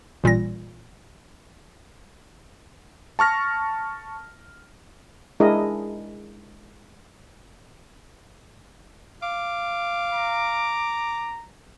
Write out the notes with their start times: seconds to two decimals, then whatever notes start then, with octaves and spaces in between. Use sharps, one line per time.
0.24 A1 A#2 G3 A#6
3.19 A5 C#6 F6 A#6
5.40 G#3 D4 E4 G#4 A#4 D#5
9.23 F5 D6
10.14 A#5